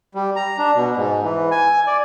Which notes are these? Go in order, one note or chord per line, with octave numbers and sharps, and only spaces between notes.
G3
A#5
D4
B2
G#2
E3
G#5
D5